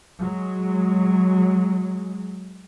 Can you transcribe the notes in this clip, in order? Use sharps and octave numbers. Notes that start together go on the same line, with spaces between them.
F#3 G#3